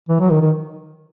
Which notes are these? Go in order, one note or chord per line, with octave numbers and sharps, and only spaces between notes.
E3
F#3
D#3
D#3